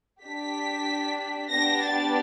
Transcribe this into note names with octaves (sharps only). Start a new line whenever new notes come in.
D4 G4 B6
B3 D4 G4 A#6
A6